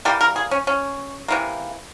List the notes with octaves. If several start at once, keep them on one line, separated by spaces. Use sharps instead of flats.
E3 G3 A#3 G4
A#4
G#4
C#4
C#4
C3 E3 A#3